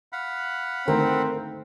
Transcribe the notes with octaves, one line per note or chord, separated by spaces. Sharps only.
F5 F#5 B5
D3 D#3 A3 C4 A#4